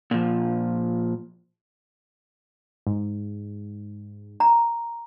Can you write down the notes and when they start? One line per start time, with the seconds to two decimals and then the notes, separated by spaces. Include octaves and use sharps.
0.11 A#2 F3
2.87 G#2
4.40 A#5